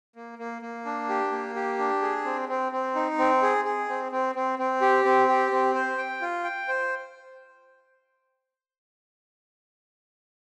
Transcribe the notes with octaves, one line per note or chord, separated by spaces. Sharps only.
A#3
A#3
A#3
D4
G4
A#3
G4
D4
G#4
C4
C4
C4
D#4
C4
G#4
G#4
C4
C4
C4
C4
G4
C4
G4
C4
C5
G5
F4
G5
C5